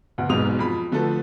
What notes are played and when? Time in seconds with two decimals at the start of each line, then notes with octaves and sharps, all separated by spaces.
0.18 D2 B2
0.29 E1 G#2 B2 F#3 D#6 F7
0.59 F2 B5
0.92 D3 F3 A3 F#4 A4 B4